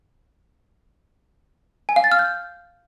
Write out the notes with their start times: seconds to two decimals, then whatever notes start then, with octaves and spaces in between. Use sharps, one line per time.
1.89 G#5
1.96 F5
2.04 A6
2.12 F6
2.19 G6